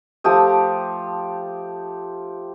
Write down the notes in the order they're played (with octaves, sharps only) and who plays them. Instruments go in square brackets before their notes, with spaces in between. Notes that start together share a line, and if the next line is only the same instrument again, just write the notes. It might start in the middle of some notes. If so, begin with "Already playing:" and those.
[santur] F3 A3 G4 D#6